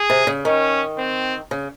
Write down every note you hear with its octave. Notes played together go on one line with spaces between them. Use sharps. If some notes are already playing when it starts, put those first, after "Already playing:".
Already playing: G#4
C3
C#3
D#3 C#4
C4
C#3